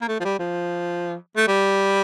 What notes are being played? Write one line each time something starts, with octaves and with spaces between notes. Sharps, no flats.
A#3
A3
F3
G3
F3
A3
G3